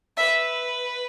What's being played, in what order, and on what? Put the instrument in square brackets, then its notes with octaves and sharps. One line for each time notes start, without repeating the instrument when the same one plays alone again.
[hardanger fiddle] B4 [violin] E5